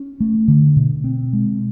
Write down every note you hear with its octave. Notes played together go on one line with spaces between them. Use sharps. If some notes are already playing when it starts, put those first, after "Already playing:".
Already playing: C#4
A3
D3
B2
C4
G#3